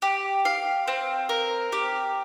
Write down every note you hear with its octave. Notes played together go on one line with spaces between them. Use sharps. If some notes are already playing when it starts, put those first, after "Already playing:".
G4
F5
C4
A#4
G4